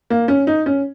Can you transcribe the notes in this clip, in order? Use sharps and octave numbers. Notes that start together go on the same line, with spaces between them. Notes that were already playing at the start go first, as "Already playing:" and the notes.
A#3
C#4
D#4
C#4